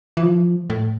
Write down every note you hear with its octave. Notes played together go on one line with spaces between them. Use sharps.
E3
F3
A2